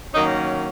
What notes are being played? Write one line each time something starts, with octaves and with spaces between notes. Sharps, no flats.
D#3 F#3 A#3 C#4 D#4